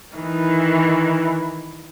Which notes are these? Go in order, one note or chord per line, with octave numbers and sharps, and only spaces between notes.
D#3 E3